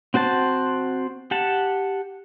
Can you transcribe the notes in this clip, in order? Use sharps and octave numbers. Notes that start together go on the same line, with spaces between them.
C4 F#4 C5 A5
G4 F#5 A5